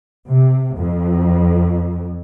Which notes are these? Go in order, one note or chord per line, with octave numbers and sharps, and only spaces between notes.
C3
F2